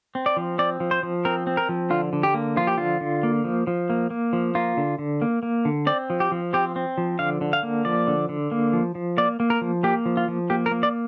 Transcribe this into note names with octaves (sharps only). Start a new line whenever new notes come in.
C4
D5
F3
C4 D5
F3
C5
F3
C4 A#4
C4
A#4
F3
D3 F4
D3
G4
A#3
F3 F4
G4
D3 F4
D3
A#3
F3
F3
A#3
A#3
F3
A#3 F4
D3
D3
A#3
A#3
D3
C4 D5
F3
G4
F3
C4 G4
C4
F3
D3 F5
D3
F5
A#3
F3 D5
D3
D3
A#3
F3
F3
A#3 D5
A#3
A#4
F3
A#3 G4
F3
F4
F3
A#3 G4
A#4
A#3
D5